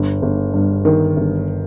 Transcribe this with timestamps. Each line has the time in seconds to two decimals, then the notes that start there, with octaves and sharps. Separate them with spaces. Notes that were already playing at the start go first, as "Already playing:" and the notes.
Already playing: G1
0.22 G1
0.54 G2
0.85 D#3
1.16 G1